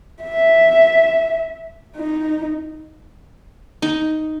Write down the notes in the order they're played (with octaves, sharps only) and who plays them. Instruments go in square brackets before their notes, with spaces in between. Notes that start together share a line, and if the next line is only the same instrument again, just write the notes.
[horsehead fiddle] E5
D#4
[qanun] D#4